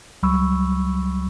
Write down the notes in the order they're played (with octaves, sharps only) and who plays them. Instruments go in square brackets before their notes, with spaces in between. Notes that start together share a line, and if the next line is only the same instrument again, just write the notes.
[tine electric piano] C#2 F#3 G3 B5 C#6 E6